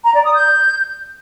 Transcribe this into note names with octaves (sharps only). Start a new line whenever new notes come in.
A#5
D5
D#6
G6